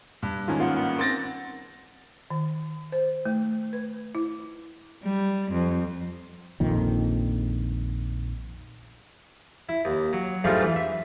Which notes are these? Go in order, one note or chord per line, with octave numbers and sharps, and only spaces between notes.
G2
G#2 D#3 C#4 F4 G#5 A5
A#3 B3 F4 F5
B3
C4 A#4 A6 A#6
D#3
C5
A3
B4
E4
G3
F2
A#1 F2 A#2 D#3
E4
D#2
F#3
G#2 G3 A3 D4 F4
E3
E5